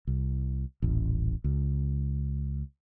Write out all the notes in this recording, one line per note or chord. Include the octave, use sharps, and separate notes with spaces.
C2
D#1 A1
C#2